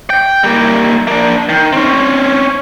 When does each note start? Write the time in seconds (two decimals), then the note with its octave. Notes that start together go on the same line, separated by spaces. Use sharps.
0.10 G5
0.44 G3 A#3
1.08 A#3 D4
1.49 D#3
1.73 C4 C#4